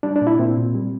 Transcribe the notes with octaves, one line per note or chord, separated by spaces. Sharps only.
G3 D4
D4
A#2
E4
A#2 C4
A#2
G3